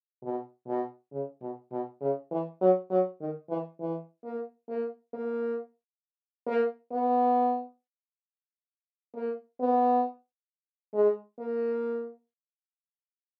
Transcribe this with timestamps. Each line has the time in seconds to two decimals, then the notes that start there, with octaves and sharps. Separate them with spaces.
0.23 B2
0.67 B2
1.12 C#3
1.41 B2
1.72 B2
2.01 C#3
2.31 E3
2.61 F#3
2.90 F#3
3.21 D#3
3.49 E3
3.80 E3
4.24 A#3
4.69 A#3
5.14 A#3
6.47 A#3
6.92 B3
9.15 A#3
9.60 B3
10.94 G#3
11.39 A#3